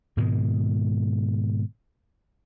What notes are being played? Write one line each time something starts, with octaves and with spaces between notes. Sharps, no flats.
G#2 B2 D#3 G#3